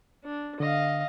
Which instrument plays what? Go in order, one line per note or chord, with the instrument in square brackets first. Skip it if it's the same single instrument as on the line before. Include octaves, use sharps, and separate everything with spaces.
[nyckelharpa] D4
[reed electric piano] D3 [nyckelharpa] D#5 F5